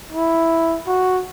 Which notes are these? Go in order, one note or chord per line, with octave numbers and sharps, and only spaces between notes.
E4
F#4